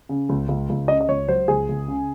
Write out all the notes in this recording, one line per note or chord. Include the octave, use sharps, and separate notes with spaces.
C#3
C#2
C#2
C#2
C#3 D#5
D#5
C#2 C#5
F#3 C5
C#2 G#4
C#2
C#3